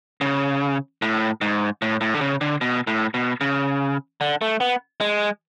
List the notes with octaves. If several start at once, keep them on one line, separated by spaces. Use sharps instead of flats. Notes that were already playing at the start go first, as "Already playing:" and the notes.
C#3
A2
G#2
A2
A2
D3
C#3
D3
B2
A2
B2
C#3
D3
A3
B3
G#3